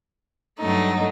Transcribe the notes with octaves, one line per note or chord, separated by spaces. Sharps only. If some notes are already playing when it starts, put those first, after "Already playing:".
G2 F#3 A3 D#4